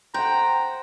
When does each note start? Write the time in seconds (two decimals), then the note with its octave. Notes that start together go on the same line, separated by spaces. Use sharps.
0.14 C5 F#5 G5 A#5